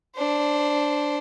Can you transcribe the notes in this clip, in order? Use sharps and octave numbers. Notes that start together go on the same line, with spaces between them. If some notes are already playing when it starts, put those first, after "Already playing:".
D4 C5